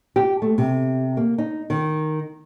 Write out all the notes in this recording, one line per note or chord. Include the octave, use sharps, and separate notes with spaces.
G4
A3
C3
A#3
D#4
D#3